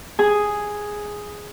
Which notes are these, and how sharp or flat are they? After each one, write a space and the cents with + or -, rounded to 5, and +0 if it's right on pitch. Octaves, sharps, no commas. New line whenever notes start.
G#4 +0 G#5 +0